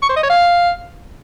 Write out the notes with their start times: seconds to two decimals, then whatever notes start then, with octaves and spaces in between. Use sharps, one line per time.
0.02 C#6
0.09 C5
0.16 D#5
0.23 C#5
0.30 F5